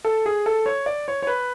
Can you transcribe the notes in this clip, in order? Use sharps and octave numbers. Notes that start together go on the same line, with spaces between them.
A4
G#4
A4
C#5
D5
C#5
C#5
B4